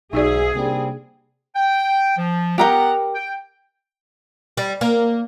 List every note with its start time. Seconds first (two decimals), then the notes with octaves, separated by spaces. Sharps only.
0.13 B1 G#2 D#4 F#4 G#4 D5 E5
0.55 C3 G3 A#3 C4 D4
1.56 G5
2.18 F3
2.58 B3 G4 A#4 F#5 G5 A#5
3.15 G5
4.57 G3
4.81 A#3